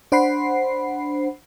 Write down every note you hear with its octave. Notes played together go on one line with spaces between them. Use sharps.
D4 C5 F#5 B5 C7